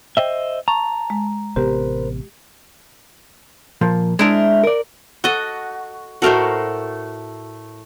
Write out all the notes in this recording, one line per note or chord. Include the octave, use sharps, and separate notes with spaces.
C5 D#5 E5 G5
A5 A#5 C#6
G#3
A1 C3 B3 G4 A#4 C5
A#2 F3 A#3
G#3 D4 E4 A#4 C5
A#4 D5
F#4 A4 D#5
A2 A3 F#4 A4 A#4 C5